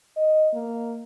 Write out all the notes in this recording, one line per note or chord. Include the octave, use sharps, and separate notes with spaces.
D#5
A#3